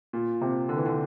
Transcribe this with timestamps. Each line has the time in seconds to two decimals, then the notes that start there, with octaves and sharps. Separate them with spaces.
0.13 A#2
0.41 C3
0.69 D3
0.77 E3
0.86 D3